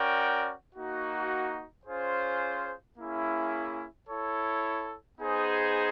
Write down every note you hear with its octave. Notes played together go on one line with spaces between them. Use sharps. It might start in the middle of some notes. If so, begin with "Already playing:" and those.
Already playing: C#4 F#4 A#4 D5 G5
A#3 D#4 F#4
C#4 F4 G#4 C5
A#3 C#4 E4 G#4
E4 A4 C#5
B3 D#4 G#4 C5